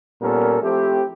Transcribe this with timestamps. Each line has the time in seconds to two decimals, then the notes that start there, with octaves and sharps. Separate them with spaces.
0.22 A#2 G3 B3 C#4 A4 A#4
0.62 F3 A3 C4 E4 G4